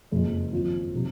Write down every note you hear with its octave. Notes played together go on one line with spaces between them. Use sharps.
F#1 F2 C#3 G#3
G#1 F#2 F3 C4 F4
C3 D#3 F#3